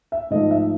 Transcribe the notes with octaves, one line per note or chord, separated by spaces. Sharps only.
E5
G#2 F3 A3 D#5
E5